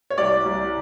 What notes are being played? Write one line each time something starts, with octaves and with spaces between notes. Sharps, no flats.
C#5
C2 D5
C2